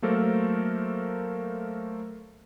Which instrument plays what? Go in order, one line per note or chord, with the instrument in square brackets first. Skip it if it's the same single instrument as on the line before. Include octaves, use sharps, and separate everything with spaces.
[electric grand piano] F#3 A3 A#3 A4 A#4 C5